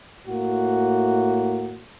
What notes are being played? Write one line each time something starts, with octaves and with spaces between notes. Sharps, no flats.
A2 A#3 F#4